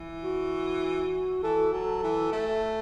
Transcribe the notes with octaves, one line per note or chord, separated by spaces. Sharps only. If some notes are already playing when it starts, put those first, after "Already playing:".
Already playing: E3
F#4
E3 A4
F#3 A4
E3
A3